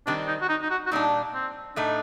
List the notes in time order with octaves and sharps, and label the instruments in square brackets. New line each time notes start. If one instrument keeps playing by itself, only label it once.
[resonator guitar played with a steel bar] D#3 G3 C4 [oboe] D4
[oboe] D#4
F#4
D#4
D#4
F#4
F#4
[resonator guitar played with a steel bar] A#2 G3 D4 [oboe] D#4
[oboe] C4
[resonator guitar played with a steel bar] A2 A3 D#4 [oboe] D4